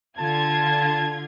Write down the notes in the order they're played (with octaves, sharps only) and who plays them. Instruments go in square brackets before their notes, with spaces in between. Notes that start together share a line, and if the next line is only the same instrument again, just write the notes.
[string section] D3 F4 G#6 [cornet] A5